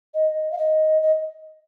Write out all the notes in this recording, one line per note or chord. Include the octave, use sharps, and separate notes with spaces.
D#5
F5
D#5
D#5